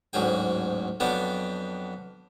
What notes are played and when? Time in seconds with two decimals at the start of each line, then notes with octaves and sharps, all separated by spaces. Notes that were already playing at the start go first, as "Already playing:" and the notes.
0.13 A1 D2 G#2 F#3 G#4 G5
1.00 F2 F#3 B3 D4 G5